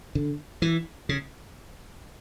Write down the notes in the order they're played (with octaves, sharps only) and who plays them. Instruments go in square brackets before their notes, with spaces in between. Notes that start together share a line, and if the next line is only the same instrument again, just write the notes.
[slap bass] D3
E3
C#3